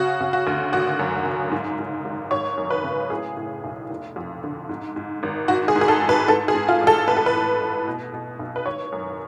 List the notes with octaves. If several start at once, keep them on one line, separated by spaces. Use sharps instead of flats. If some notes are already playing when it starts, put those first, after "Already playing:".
Already playing: C#3 F#4
C#3
F#4
D2
G#1 F#4
F#2
C#3
G#2
G#2
G#1
G#1 C#5
F#2
B4
C#3
A2 G#4
A2
B1
F1
F2
D3
G#2
G#2
G#1
G#2 F#4
G#4
G#2
G#4
A4
A1
B4
G#2 A4
G#4
G#2
F4
A1
A4
A2 B4
A4
B4
A2
A1
B2
B2
B1
B4
G#1 C#5
F#2